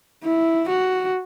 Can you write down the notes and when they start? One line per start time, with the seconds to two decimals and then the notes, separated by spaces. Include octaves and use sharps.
0.24 E4
0.69 F#4